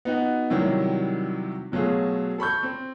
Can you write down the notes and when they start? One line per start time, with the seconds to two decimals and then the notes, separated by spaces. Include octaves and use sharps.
0.05 B3 D#4 F#4
0.50 C3 D#3 F#3 G3 E4
1.72 B2 F#3 A3 F4 G#4
2.38 A4 B5 C#6 G6
2.63 C4